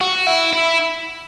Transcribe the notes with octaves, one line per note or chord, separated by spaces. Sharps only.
F#4
E4
E4